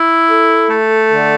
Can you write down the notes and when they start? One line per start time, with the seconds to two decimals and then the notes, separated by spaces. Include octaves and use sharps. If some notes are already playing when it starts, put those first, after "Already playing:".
Already playing: E4
0.28 A4
0.68 A3
1.11 D3